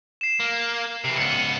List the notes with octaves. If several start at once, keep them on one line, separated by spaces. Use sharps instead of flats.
C7 E7
A#3
C3 E3 C7
C#2 B3 C#7
D#7